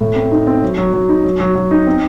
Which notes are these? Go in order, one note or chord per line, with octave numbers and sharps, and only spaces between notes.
A2
C4
D#4
C4
F#3
F#3
F#3
D#4
F#3
F#3
F#3
D#4
C4